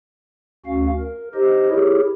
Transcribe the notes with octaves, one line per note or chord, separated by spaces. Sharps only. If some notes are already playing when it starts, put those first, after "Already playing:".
D2 C#4 F#4 F5
A#4
D#4 G4 C5 D#5
E4 G4 G#4 A#4 C#5